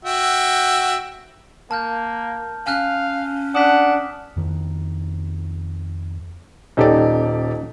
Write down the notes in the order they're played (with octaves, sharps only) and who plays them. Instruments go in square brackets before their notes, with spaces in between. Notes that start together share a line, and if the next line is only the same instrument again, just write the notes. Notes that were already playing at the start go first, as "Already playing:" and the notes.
[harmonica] F#4 E5 G5
[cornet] A#3 [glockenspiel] A5 F6 G6
[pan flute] C#4 [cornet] F5 [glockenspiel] G#5 F6 F#6
[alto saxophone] D4 [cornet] F#5 [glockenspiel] D#6 B6
[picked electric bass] F2 D#3
[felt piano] D#1 G4 D5 [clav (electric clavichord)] C#4 D#4 A4